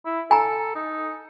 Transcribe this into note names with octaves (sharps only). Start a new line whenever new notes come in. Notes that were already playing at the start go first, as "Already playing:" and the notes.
E4
A4 G#5 A#5
D#4